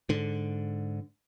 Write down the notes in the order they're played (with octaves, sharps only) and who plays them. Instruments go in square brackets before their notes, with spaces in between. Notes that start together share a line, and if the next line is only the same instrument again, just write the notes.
[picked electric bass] G#2 D3